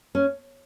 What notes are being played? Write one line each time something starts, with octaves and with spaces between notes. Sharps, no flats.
C#4